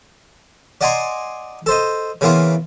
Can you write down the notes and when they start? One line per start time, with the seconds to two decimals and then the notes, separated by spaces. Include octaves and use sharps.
0.81 D5 D#5 F#5 G#5 A#5 C6
1.66 A4 C5 D#5
2.21 C#3 E3 A#3 B3 F4